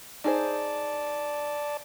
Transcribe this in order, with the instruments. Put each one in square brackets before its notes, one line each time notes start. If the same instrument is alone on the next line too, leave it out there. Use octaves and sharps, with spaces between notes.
[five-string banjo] D#4 G#4 C5 [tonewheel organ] D5 A5